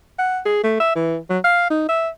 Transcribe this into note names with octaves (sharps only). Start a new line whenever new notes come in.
F#5
G#4
A3
E5
E3
F#3
F5
D#4
E5